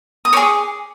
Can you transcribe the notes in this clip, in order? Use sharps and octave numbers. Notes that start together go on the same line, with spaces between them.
D#6
G#4 C#5 D6